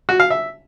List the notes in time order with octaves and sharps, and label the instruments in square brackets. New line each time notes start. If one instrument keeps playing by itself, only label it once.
[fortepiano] F#4
F5
E5